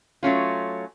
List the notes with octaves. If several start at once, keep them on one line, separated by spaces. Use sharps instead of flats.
F#3 A3 C#4 F4